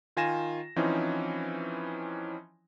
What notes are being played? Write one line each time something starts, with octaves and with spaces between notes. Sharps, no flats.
D#3 F4 G#5 A#6 E7
E3 F3 C4 C#4 D#4 E4